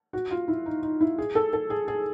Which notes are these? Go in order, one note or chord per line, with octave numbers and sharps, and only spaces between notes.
F#4
F4
E4
D#4
D#4
E4
G#4
A4
A4
G#4
G#4